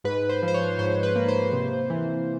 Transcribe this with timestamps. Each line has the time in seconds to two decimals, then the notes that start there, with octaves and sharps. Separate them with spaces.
0.04 G#2 B4
0.29 C5
0.42 F3
0.48 C5
0.54 C#5
0.79 G#2 C5
1.03 B4
1.16 A#3
1.28 C5
1.52 C3
1.90 E3